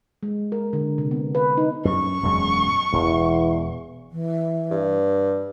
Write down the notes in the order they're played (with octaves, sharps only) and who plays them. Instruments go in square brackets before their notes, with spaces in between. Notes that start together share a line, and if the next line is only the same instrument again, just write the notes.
[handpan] G#3
A#4
D3
C3
B3
B4
D#4
[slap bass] F#2 [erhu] C#6
[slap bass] E1 F#2 G#3
[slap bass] E1 [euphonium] E2
[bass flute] E3
[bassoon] G2